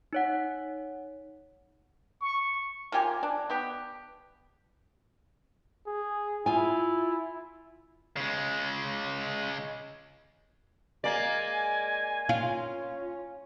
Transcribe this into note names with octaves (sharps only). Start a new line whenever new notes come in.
D#4 C#5 F#5
C#6
A#3 F4 G4 G#5
D4
B3 G4
G#4
E4 F4 G#5
C#3 G#3
G#3 A#3 D5 G#5
C#4 F4